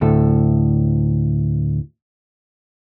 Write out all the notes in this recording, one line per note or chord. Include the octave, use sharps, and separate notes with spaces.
D2 A2 A4